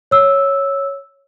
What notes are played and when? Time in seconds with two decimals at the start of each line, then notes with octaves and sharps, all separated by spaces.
0.11 C#5 E6